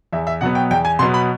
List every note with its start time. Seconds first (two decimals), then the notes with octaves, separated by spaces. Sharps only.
0.13 E2 E5
0.27 E5
0.41 B2 F#3 B3 F#5
0.55 G5
0.70 E2 G5
0.85 G#5
0.99 B2 F#3 B3 C6
1.14 B5